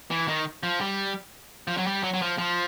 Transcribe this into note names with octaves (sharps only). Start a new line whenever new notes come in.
E3
D#3
F3
G3
F3
F#3
G3
F#3
F#3
F3
F3